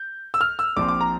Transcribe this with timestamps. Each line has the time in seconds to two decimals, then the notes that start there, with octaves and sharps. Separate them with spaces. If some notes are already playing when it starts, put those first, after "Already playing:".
Already playing: G6
0.34 E6
0.41 F6
0.59 E6
0.76 A#1 A#2 F3 C4 D6
0.88 D6
1.01 A#5